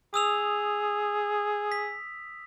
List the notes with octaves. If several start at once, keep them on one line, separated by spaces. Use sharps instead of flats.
G#4 D#6 E6 F7
B6